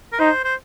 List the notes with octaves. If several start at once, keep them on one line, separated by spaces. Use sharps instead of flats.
A#4
D#4 C5
C5